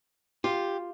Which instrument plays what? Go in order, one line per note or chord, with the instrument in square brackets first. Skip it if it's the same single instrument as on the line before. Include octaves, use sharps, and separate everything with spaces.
[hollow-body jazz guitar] F4 [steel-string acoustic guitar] G4